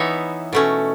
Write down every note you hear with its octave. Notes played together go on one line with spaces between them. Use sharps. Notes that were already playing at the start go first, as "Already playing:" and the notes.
Already playing: E3 B3 D#4 C#5 E5
B2 A3 C#4